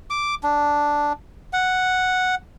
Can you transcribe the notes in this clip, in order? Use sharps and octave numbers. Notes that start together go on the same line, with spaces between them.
D6
D4
F#5